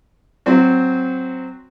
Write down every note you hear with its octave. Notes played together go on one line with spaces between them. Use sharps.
F#3 C4 F#4